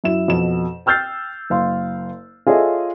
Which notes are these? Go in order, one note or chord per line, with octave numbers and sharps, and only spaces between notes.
F#2 E4 E7
F2 B2 E7
G5 E6 F6 G6 A6 C7
F#1 F5 C6
F4 G#4 A4 C#5 D#5 E5